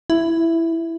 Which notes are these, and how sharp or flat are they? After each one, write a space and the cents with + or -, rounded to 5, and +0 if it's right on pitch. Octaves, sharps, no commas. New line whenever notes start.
E4 +5